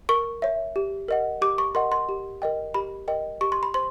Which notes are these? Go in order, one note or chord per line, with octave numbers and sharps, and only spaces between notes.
A#4 C#6
C#5 E5
G4
A#4 D#5 F#5
G4 D6
C#6
A#4 D#5 F#5 C6
C6
G4
A#4 D#5 G5
G4 B5
A#4 D#5 G5
G4 C#6
C6
B5
C5 C6